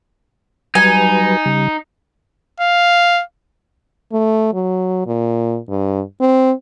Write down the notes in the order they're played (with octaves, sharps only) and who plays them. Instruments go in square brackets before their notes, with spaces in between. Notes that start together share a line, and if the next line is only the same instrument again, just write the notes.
[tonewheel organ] F#3 G3 B4 [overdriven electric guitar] D#4 [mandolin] G#5
[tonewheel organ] C#3 G3
[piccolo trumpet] F5
[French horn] A3
F#3
A#2
G2
C4